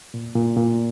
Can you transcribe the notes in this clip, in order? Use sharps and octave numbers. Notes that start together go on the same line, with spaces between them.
A#2
A#2
A#2